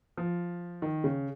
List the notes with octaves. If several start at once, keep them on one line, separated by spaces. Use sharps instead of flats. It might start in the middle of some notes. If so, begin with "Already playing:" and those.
F3
D#3
C#3